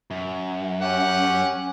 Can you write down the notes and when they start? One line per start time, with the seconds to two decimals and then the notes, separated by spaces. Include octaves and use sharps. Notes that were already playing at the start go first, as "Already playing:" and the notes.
0.11 F#2
0.82 C#4 G4 F#5